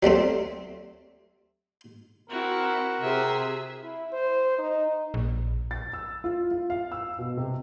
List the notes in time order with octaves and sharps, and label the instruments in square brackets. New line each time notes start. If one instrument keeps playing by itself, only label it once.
[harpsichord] F#3 G3 A3 C4
[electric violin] C4 E4 [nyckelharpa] F#4 [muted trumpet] A#4
[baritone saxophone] C3 [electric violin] G#4 E5
[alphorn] E4
C5
D#4
[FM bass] A#1
[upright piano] A6
E6
F4
F4
F5
E6
B2
C3